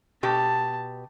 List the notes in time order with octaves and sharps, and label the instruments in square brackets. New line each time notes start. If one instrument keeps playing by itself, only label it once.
[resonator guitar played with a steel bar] B2 G4 [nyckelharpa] A5